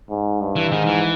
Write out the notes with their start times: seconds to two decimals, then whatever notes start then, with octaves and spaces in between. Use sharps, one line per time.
0.10 G#2
0.40 G2
0.56 E3
0.72 G#2 D#3
0.86 E3